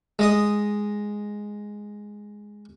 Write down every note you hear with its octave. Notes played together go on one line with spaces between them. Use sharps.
G#3 D#5 D#6